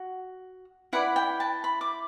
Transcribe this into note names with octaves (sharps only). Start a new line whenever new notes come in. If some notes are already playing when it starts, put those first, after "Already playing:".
Already playing: F#4
E4 B4 D5 F#5
G5
A5
B5
D6